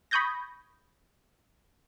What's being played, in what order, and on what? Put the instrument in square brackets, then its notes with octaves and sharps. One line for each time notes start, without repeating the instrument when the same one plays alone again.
[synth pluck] B5 C#6 D#6 G6 G#6 A#6